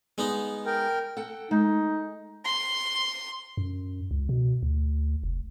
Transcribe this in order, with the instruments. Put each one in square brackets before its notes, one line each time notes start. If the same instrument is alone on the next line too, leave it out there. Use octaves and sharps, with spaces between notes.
[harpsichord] G#3 B3 D#4
[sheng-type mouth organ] A#4 G5
[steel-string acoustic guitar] A4 F#5 G5
[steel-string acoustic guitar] G#3 [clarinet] D#4
[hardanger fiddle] C6
[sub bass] F#2
C#2
B2
D2
F1